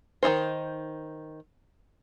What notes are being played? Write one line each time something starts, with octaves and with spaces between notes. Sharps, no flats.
D#3 E3 D#4 C5